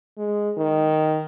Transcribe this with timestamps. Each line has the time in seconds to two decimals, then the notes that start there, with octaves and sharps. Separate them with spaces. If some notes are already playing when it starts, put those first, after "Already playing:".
0.18 G#3
0.58 D#3